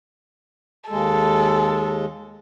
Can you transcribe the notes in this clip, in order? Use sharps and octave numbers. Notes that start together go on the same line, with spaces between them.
D#2 G#3 A4